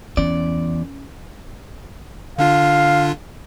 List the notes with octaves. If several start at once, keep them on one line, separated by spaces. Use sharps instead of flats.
E2 C#4 D5
D3 D4 F4 F5